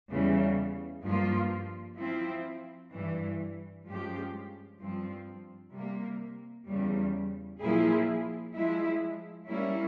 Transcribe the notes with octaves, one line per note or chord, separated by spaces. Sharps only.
E2 C#3 E3 G3
G2 F3 A#3 F4
F3 C4 E4
G2 E3 G3
G2 F3 G#3 C#4 G4
G2 F3 C4
C3 G3 A#3
E2 C#3 G3
A#2 F3 A#3 E4 G#4
F3 G#3 E4
G3 A#3 C#4 E4